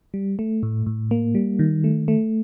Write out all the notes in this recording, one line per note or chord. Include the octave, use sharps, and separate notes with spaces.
G3
A3
A2
A2
A#3
G3
D#3
A3
A3